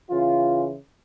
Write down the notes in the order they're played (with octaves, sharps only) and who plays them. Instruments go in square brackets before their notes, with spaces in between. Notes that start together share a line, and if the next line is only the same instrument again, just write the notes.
[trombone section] C#3 E3 F4